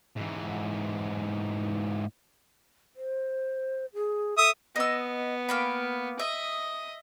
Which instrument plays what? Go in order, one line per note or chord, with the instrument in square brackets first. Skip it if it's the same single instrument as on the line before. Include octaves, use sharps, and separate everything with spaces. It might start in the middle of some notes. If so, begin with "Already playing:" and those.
[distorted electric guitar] G#2 E3
[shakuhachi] C5
G#4
[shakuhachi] A4 [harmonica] E5 D#6
[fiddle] B3 [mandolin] D#5 E6
[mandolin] A#3 G5 B5
[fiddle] D#5 D#6 [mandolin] E5